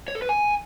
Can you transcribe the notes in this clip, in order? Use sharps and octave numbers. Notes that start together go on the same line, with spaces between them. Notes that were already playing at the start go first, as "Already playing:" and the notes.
C#5
A4
B4
G#5